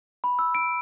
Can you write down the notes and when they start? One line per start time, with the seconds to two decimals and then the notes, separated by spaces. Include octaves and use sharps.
0.24 B5
0.39 E6
0.55 D7